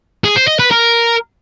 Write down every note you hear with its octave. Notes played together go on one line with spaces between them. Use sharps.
G#4
C5
D#5
B4
A#4